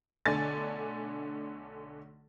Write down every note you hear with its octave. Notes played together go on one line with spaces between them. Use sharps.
B1 D3 A3 D5 G#5 A6